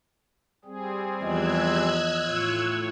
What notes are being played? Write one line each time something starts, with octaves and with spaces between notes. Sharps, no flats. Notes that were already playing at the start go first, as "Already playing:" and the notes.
G3 C4 G#4
E2 F3 D#5 E6 F#6 G#6
A2 F4 C#5